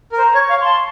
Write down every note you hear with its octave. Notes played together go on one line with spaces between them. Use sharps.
A#4
C5 A#5
C#5
C#6
F5
A5 C6